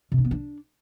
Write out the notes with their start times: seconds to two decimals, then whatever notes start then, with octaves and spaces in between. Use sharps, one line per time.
0.12 C3
0.18 D4
0.25 B3
0.31 D4